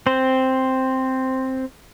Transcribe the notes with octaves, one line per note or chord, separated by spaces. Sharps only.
C4 C5